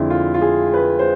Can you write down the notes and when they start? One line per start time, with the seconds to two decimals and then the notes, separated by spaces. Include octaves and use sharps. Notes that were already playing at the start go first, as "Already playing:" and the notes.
Already playing: F2 D3 G#3 E4
0.10 F4
0.34 F4
0.42 G#4
0.74 B4
0.99 C5